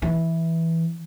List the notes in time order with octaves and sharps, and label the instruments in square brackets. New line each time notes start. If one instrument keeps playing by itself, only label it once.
[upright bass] E3